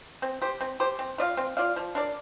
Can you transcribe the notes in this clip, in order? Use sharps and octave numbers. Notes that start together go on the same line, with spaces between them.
C4
G4 C5
C4
G4 C5
C4
F4 D5 F5
C4
F4 D5 F5
F3
D4 A#4 D5